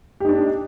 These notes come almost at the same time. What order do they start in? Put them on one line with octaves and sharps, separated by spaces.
G4 D#4 D4